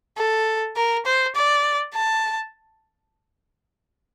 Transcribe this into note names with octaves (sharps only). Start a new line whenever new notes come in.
A4
A#4
C5
D5
A5